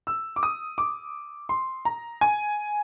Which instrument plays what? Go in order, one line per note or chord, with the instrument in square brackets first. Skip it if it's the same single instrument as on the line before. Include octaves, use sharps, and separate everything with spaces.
[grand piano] E6
D6
D#6
D6
C6
A#5
G#5